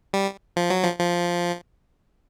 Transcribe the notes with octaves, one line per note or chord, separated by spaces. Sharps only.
G3
F3
F#3
F3
F3